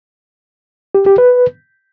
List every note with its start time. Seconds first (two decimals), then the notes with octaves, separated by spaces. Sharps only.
0.95 G4
1.06 G4
1.18 B4